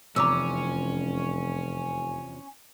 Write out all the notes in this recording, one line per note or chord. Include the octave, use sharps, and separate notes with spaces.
F1 E2 C3 F3 C#4 A#5 D6 E6